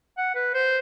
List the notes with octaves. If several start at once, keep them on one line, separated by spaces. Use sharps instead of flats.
F#5
B4
C5